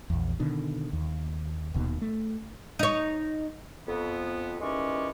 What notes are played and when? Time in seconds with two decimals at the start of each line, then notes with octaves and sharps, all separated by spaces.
0.10 A#1 E2
0.40 B2 D3 D#3
0.93 D#2
1.74 D#1 D#2 B2 D#3
2.02 A3
2.79 D#4 C#5
3.87 F2 B3
4.60 D#2 E3 G#3 C#4 D5 C#6